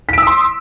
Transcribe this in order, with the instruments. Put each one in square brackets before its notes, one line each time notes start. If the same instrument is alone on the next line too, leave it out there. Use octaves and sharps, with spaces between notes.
[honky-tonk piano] B6
D7
E6
D#6
C6